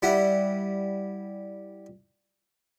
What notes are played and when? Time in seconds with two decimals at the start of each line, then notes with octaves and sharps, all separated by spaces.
0.03 G3 E4 F#5